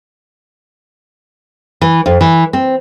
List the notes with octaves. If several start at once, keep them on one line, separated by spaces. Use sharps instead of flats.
E3
F2
E3
C4